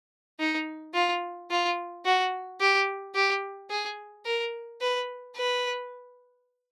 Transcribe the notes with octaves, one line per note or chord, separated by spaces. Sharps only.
D#4
F4
F4
F#4
G4
G4
G#4
A#4
B4
B4